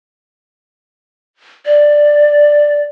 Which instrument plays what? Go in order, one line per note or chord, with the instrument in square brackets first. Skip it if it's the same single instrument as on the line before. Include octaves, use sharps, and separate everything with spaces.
[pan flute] D5